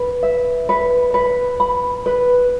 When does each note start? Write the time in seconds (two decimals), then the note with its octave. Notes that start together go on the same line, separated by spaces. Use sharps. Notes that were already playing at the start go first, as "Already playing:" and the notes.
Already playing: B4
0.23 E5
0.69 B4
1.14 B4
1.60 B5
2.06 B4